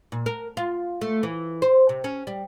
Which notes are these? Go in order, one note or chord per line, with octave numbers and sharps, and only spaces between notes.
A#2
A#4
F4
A3
E3
C5
C3
C#4
G3